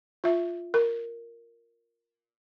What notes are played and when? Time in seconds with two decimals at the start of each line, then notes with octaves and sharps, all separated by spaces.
0.24 F4 E5
0.74 A#4